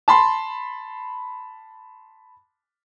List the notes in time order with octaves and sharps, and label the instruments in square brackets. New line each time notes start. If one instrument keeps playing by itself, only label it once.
[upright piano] A5 B5 C6